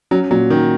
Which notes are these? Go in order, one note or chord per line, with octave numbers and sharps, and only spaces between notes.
F#3 C#4
A#2 F#3
D#3 C#4